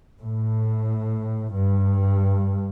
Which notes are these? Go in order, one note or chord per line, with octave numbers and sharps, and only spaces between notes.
A2
G2